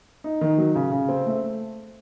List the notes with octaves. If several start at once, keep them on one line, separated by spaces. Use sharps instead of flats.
D#4
D#3
F#3
C#3
C#3
C4
A3